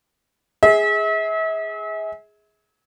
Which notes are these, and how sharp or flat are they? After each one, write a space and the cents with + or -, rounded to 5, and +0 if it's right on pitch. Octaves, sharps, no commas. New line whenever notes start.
G#4 +0 E5 -40